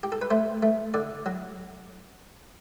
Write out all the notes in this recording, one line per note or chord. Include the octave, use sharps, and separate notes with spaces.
G4
A4
B4
A3 C5
A3
D3 D5
F#3